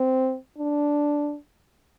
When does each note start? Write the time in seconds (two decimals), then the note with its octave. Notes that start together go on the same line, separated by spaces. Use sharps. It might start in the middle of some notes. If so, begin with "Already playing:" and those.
Already playing: C4
0.58 D4